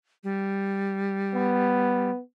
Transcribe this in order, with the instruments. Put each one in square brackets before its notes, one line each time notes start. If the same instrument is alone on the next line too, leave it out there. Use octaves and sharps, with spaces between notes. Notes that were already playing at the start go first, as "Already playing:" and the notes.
[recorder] G3
[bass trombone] B3